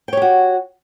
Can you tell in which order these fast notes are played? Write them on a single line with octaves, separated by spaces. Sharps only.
G5 C#5 G4 F#4